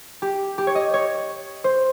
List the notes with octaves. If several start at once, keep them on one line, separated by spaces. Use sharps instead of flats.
G4
G4
C#5
D#5
C#5
C5